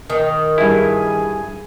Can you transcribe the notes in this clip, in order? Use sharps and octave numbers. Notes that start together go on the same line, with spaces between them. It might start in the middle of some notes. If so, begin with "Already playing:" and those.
D#3
G2 E4 G#4 G#5